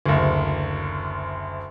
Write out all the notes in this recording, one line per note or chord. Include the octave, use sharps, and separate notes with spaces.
F#1 D2